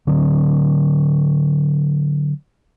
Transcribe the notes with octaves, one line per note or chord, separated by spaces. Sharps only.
D3 F#3 C4